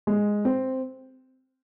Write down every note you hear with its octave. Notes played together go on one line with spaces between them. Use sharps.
G#3
C4